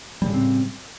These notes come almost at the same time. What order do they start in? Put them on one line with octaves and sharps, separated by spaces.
G3 C#3 A2 C4